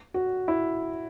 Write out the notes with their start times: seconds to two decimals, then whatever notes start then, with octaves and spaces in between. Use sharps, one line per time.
0.14 F#4
0.48 E4